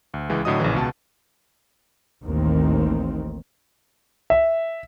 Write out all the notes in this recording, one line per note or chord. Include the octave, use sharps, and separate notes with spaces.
D2
C#2 E3 G#3
A2 D3 F#3 D#5 D#6
A#1 C#3 E3
C#2 B2 A5
A1 D#2 D#3 C4
E5